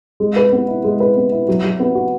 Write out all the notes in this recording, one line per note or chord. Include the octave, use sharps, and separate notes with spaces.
G#3
B4
B3
E4
G#3
B4
B3
E4
F#3
F#3
B3
F#4